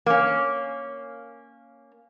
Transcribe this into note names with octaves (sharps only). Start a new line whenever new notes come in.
A#3 C#4